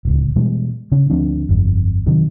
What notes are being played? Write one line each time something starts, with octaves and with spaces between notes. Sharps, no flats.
D1 C#2
B2 E3 G3 G#3
C#3 C#4
D2 F3 C4 D4
G1 F2
C3 D#3 F#3